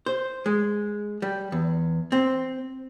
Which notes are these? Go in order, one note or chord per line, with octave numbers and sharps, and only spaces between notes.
C5
G#3
G3
E2
C4